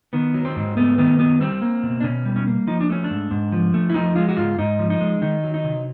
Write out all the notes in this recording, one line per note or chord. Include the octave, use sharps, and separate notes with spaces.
D#3 B3
F#3
C4
G#2
A3 B3
D#3 B3
F#3 B3
G3 C4
A#3
B2
D4
B2 C#4
G3
C#4
A#3
F3 D#4
D4
A3 C#4
D4
G#2
G#2
F3
A3
E4
F3 D#4
G#3 F4
F#4
G#2 F4
G#2 D#4
F3
D#4
G#3
D#3 D#4
F#3
D#4
C3